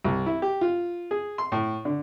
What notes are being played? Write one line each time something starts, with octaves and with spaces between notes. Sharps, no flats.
C2
E4
G4
F4
G#4
C6
A2
D3